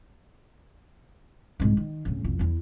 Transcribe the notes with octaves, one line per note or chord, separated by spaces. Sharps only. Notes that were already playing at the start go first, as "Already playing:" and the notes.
C2 G#2
D#3
D1 C#3
C2 F2
E2 E4